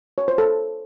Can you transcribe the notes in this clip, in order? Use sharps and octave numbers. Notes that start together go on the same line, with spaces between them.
C#5
C5
A4